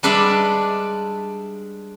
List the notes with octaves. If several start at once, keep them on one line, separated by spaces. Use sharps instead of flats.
G3 G#3 D4 B4 D5 E5